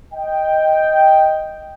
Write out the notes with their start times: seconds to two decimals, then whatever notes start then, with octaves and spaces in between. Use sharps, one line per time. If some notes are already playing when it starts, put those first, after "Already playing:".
0.13 D#5 G5